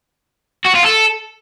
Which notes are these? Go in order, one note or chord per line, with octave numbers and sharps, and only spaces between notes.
F#4
F4
A4